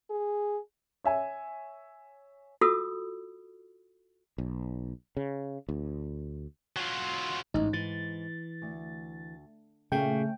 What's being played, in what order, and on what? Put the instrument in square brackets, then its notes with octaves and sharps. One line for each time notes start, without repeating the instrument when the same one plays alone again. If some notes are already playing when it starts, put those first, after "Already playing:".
[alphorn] G#4
[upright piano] C#5 E5 G#5
[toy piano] F4 F#4 A4 B5 D#6 E6
[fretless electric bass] B1
C#3
D2
[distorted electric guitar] F#3 F4
[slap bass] A1 [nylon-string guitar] D2 G#2 [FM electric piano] D#4
[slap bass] E3 [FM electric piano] A6
[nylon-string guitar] D2
[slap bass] A#2 [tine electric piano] C#3 [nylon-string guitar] A3 C#4 [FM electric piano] G5